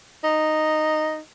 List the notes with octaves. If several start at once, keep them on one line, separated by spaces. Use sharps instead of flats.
D#4